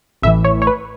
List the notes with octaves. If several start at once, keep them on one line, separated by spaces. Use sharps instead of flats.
A1 A2 E3 E5
C#5
C#5
B4